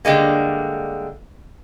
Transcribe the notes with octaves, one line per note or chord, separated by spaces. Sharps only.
D3 G3 G#3 A#3